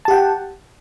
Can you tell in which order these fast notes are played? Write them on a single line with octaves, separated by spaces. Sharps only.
A5 G4 F#5 G5